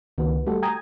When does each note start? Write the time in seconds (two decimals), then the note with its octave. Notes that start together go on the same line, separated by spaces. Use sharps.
0.18 C#2 D#3 A#3 F#4 B4
0.46 G3 A3 F#4 G4 A4
0.62 G5 G#5 A#5 D#6 G#6